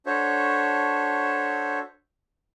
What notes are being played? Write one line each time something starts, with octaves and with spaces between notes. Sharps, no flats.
D4 F#4 A4 C5 C#5 E5